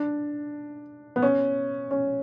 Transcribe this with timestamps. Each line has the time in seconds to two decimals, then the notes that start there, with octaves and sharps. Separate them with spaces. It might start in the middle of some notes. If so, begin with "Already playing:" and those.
Already playing: D4
1.16 B3
1.22 C#4
1.91 C#4